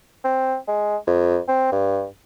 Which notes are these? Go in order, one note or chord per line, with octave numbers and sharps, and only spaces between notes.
C4
G#3
F2
C4
G2